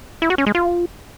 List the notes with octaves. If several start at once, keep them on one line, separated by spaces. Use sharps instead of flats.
E4
F#4
C#4
G#3
F4